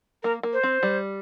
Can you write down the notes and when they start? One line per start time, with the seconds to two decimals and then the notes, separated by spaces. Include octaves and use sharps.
0.23 A#3 A#4
0.43 A#3
0.53 C5
0.63 C4
0.83 G3